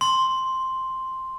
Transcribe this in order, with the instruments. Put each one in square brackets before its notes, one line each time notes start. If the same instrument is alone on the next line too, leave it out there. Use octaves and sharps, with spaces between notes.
[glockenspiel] C6